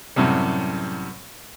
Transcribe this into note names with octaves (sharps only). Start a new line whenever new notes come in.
F#2 A2 C3 G3